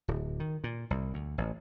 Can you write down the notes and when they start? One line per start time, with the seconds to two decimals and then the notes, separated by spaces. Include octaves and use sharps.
0.08 D1
0.40 D#3
0.64 A#2
0.91 C2
1.14 D2
1.38 A1